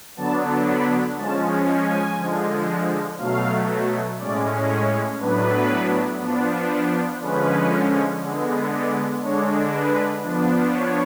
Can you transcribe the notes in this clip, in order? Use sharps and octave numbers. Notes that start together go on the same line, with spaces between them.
D3 F#3 B3 D4 A5
B5
F3 G#3 C#4 A5
G#5
D3 F3 G#3
B2 F#3 A3 F5
A2 G#3 C#4 D5
C#5
A2 F#3 B3 D4 B4
F3 B3 D4
D3 F3 G#3 C#4 B4
D3 G#3 B3
D5
D3 G#3 D4 C#5
B4
F3 B3 D4
C#5